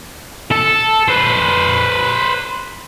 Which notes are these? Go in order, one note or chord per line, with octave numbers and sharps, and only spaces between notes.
A4
B4 C5